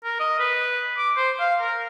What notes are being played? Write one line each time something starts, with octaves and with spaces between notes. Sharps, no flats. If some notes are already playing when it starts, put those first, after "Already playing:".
A#4
D#5
B4
D6
C5
F5
A#4